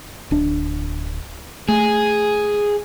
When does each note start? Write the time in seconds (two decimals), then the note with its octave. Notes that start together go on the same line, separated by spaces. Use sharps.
0.31 D1 D4
1.69 A3 G#4